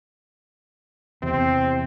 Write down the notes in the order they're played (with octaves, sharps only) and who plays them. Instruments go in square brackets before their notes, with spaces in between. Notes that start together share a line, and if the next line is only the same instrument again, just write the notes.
[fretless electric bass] E2 [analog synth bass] C3 [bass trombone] C4